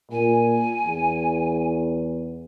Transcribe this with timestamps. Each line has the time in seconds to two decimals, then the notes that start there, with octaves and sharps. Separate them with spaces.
0.12 A#2 G#5
0.85 E2